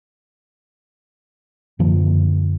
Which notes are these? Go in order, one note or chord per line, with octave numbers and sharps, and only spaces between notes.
F#2 D3 F3 A#3